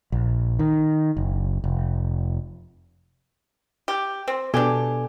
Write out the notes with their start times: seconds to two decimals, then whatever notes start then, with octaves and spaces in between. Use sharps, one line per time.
0.12 A#1
0.59 D#3
1.17 F#1
1.64 F1
3.88 G4
4.28 C4
4.54 B2 D4 G4 A4 G#5